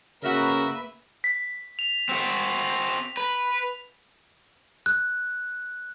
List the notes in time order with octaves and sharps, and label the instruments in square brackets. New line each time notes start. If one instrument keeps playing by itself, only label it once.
[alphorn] C#3 [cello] A#3 B4 [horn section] F#4 A#4 [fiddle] E5
[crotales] B6
F7
[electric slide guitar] C4 F#4
B4
[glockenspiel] F#6